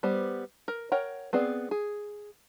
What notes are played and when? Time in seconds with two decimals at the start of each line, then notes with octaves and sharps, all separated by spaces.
0.03 G3 B3 C5
0.68 A#4
0.92 A#4 C#5 F#5 G5
1.33 B3 C4 G#4 D5
1.71 G#4